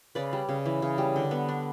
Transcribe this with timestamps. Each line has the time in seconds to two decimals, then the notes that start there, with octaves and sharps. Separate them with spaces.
0.15 C#3 B4 D5
0.33 G3
0.49 C#3
0.66 E3
0.82 C#3
0.98 G3
1.16 D3
1.31 B3
1.49 D4